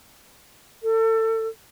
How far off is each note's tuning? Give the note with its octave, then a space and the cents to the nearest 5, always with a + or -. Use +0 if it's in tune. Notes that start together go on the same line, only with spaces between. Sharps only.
A4 +30